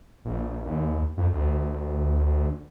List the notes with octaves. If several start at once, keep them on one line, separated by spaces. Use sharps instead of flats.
A#1
D#2
F2
D2